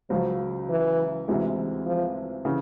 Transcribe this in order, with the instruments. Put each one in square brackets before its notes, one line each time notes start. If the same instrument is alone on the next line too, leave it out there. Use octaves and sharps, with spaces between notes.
[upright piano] C#2 C#3 F#3 [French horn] F3
[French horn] E3
[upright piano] D2 C3 E3 G#3
[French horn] F3
[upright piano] C#3 E3